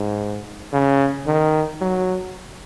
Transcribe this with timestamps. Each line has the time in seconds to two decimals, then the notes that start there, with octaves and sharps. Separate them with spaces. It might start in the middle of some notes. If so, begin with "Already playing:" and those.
Already playing: G#2
0.73 C#3
1.26 D#3
1.81 F#3